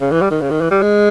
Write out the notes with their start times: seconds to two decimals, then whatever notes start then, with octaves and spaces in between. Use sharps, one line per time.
0.01 C#3
0.11 E3
0.21 G3
0.31 D#3
0.41 C#3
0.51 D#3
0.61 E3
0.71 G3
0.82 G#3